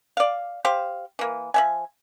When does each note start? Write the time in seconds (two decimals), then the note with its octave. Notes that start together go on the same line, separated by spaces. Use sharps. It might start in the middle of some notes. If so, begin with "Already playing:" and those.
0.17 D5 F5
0.65 G4 C5 F5
1.19 E3 A#3
1.54 F3 E5 G#5